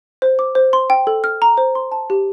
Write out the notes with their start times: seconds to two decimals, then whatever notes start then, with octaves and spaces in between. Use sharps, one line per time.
0.22 C5
0.39 D6
0.55 C5
0.73 C6
0.90 G5
1.07 A4
1.24 F6
1.42 A#5
1.58 C5
1.75 C6
1.92 A5
2.10 G4